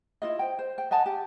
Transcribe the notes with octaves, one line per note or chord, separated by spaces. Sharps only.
E4 F4 D#5
C5 G5
C5
G5
D#5 F#5 G#5 A5
G4